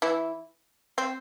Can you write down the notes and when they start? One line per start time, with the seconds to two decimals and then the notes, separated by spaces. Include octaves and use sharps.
0.02 E3 E4
0.98 C4